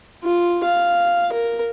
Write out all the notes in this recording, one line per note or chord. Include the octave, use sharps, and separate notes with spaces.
F4
F5
A#4